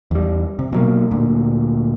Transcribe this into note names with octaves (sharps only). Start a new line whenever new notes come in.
E2 G3
C3
B2 F#3 A#3
D2 A#2